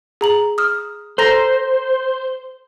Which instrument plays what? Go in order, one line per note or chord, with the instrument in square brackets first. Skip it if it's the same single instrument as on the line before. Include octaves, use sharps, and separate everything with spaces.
[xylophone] G#4 A#5 F#7
D#6 F6
[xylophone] A4 A#5 A#6 [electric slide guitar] C5